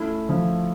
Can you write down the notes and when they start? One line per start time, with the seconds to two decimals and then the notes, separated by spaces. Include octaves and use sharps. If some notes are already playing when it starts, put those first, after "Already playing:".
Already playing: A3 C#4 E4
0.29 F3